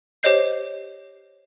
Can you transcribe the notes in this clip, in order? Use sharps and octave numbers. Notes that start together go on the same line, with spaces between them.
G4 C5 C#5 D#5 G6 C7